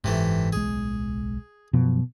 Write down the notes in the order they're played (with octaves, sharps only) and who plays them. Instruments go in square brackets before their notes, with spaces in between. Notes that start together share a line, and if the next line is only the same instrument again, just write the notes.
[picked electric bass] F#1 G#2 [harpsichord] C3 E3 A3
[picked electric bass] D1 B1 G#3 [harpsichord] G#4
[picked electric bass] F#2 F3 F#3 [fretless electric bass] B2